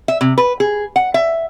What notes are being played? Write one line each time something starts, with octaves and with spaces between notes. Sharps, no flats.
E5
C3
B4
G#4
F#5
E5